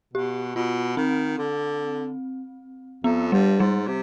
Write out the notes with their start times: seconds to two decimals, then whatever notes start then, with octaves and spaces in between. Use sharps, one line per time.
0.14 B2 G4
0.56 B2 F4
0.97 D#3 C4
1.38 D3
3.04 F2 B3
3.32 G2 G3
3.60 G#2 G3
3.87 C3